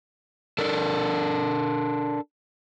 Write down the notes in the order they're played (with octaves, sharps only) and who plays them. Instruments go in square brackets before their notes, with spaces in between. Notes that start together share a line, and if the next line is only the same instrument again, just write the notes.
[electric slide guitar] D4 A4 A#4